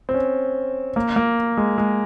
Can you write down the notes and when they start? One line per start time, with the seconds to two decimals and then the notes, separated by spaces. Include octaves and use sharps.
0.09 C4
0.14 C#4
0.96 A#3
1.16 A#3
1.57 G#3
1.78 G#3